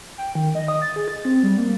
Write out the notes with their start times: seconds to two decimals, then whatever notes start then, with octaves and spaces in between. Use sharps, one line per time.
0.18 G5
0.35 D#3
0.55 D#5
0.68 D#6
0.82 A6
0.96 G#4
1.08 A6
1.25 C4
1.43 G3
1.57 A#3